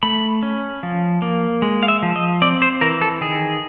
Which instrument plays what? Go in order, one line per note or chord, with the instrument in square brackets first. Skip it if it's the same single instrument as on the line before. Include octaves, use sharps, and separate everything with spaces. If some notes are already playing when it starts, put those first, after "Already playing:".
[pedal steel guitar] A3 B5
C#4
F3
A#3
G#3
F5
E5
F3
D#5
C4 D5
C5
E3 A#4
A4
D#3 G#4